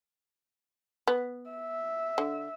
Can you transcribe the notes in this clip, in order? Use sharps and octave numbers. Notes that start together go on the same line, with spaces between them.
B3
E5
D3